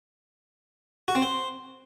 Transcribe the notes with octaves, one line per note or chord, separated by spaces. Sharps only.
F#4
C4
C5